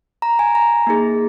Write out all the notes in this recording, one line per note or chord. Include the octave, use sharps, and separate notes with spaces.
A#5
G#5
A#5
A#3 D#4 G#4